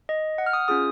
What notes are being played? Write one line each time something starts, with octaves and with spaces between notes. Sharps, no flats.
D#5
F#5
F6
D#6
C#4 F4 G#4 D#6